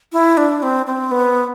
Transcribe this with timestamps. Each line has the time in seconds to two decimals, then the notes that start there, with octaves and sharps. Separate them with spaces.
0.12 E4
0.37 D4
0.62 C4
0.86 C4
1.11 B3